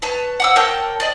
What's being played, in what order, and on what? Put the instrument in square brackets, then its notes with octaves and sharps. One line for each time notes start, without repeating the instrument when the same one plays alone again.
[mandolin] B4 C#5 A5
F#5 D6 E6
A#4 C#5 G5 A5
D5 D#5